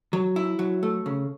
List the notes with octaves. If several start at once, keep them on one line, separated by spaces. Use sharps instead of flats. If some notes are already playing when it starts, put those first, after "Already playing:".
F#3
E4
F#3
A3
C#3